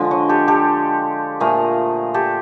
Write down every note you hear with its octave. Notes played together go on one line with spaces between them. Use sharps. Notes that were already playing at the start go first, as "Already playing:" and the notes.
Already playing: D3 F3 G#3
C#5 D#5
G4 A4
G4 A4
A#2 F3 A3 G#4 A#4
G4 A4